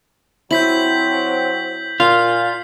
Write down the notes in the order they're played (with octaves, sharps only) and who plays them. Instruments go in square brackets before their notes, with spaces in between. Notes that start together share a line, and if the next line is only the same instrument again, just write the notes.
[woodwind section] F#3 C4 [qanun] E4 [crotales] G6 B6 F#7
[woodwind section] A#2 [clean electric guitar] F4 [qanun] F5 [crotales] C7